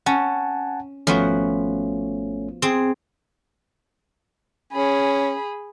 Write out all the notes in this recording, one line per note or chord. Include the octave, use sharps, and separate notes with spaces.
C#4 F#5 G#5 A5
G#1 F3 A3 B3 C#4 F#4
C4 G#4
C#4 G#4 B5